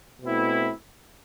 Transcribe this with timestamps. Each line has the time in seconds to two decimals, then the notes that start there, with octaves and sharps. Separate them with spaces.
0.22 B2 A3 C4 E4